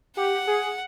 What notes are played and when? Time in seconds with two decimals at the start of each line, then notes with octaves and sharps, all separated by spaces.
0.16 G4 F#5
0.47 G#4